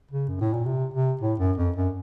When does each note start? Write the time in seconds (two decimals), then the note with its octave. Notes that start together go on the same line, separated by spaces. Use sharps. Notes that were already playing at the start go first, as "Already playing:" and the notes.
0.11 C#3
0.29 F#2
0.41 A2
0.53 A#2
0.66 C3
0.94 C3
1.21 A2
1.39 F#2
1.58 F2
1.76 F#2